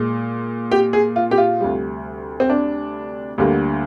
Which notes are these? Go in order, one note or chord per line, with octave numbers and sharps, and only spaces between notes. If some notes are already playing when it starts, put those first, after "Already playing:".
Already playing: A#2 G#3
G4
G#4
F4
G4
F4
D2 C3 G3
C4
D4
D2 D3 G3 A#3